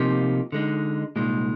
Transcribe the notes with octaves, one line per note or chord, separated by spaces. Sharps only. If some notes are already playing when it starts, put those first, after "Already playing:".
Already playing: C3 F3 A#3 D#4 G4
D3 G#3 D#4
C2 A#2 G#3 D#4